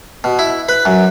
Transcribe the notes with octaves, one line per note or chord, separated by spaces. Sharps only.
B2
E4
B4
F#2